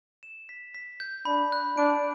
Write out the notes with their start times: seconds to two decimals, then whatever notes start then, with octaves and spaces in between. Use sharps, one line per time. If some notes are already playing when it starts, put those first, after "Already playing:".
0.23 E7
0.49 B6
0.74 B6
1.00 G6
1.25 D4 B5
1.52 F#6
1.77 D4 D7